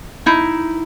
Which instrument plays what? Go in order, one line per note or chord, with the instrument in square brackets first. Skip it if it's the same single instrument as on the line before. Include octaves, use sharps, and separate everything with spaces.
[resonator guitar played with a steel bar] D#4 E4